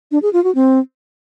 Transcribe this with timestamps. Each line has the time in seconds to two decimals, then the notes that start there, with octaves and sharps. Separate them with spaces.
0.12 D4
0.22 G#4
0.33 F4
0.44 F#4
0.55 C4